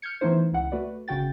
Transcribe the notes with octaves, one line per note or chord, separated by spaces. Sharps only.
F6 G6 G#6 C#7
E3 A3 B3 D#4 E4 C5
C#2 E4 F#5
A3 F#4 B4 D5
G1 C#3 F#4 G5 A6